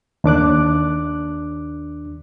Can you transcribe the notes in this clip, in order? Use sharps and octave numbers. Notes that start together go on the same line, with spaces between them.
D#2 D4 D6 F#6